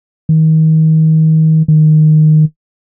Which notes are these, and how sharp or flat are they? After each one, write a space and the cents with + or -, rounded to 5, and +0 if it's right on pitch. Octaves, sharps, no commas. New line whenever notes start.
D#3 +30
D#3 -10